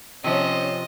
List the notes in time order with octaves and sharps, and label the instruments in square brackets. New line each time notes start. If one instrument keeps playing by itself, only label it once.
[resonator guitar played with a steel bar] C3 F3 [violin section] C#4 C5 [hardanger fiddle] D#5